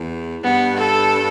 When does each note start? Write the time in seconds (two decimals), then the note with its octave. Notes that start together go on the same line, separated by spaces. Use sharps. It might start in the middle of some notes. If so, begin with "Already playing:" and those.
Already playing: E2
0.43 G2 B3
0.77 A4